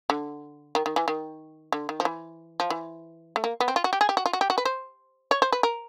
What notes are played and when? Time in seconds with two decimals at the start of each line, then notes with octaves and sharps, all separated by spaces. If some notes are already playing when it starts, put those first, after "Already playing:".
0.10 D3
0.75 D#3
0.86 D#3
0.96 E3
1.08 D#3
1.72 D3
1.89 D#3
2.00 F3
2.05 E3
2.60 F3
2.70 E3
3.36 A3
3.44 A#3
3.60 B3
3.68 C4
3.76 F4
3.84 F#4
3.93 G4
4.01 G#4
4.09 G4
4.17 F#4
4.26 F4
4.33 F#4
4.41 G4
4.50 F#4
4.58 B4
4.65 C5
5.31 C#5
5.42 C5
5.52 B4
5.63 A#4